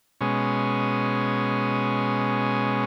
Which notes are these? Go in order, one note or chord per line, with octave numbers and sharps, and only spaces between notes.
B2 G#3 C#4